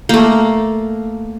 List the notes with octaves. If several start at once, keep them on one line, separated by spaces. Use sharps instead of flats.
A3 A#3